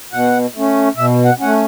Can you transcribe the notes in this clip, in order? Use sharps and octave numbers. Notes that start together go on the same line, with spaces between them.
B2 F#5
A3 C#4
B2 E5
F#5
A3 C#4 F#5